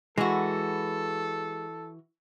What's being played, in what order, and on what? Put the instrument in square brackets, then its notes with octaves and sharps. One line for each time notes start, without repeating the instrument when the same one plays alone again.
[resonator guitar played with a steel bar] E3 F#4 [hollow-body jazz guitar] G#3 [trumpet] A4